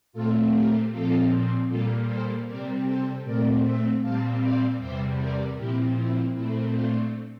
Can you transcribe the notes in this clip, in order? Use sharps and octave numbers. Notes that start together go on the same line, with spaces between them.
A#2 A3 C4 F4 A4
G4 A#4
A#2 F3 C4 F4 A4
A#2 G3 A#3 F4 A4
A4 C5
C3 G3 C4 A#4 D5
A4 C5
A#2 A3 C4 A#4 D5
C5 E5
A#2 G3 C4 F5 A5
D5 F5
E2 C3 G3 C5 E5
A#4 D5
A#2 F3 C4 E4 G4
E4
A#2 A3 C4 E4
D4 F4